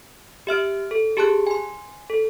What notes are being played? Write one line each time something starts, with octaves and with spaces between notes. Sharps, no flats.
G4 E5 F6 D7
A4
G4 G#4 A5 C6 F#6
G#5 C6
A4